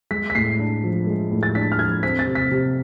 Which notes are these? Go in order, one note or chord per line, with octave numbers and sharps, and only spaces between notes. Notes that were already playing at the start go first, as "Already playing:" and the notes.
G#3 B6
B6
A2 C7
D4
F3
G#3
A2
A6
D4 B6
F6
F3 G#6
C4 B6
A6
C3
B6
C3